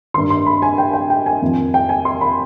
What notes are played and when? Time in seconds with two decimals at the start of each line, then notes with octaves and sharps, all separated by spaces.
0.14 G2 D#3 C6
0.30 C6
0.46 B5
0.62 G#5
0.78 G5
0.93 G5
1.10 G5
1.26 G#5
1.42 F2 D#3
1.74 G5
1.89 G#5
2.05 C6
2.21 B5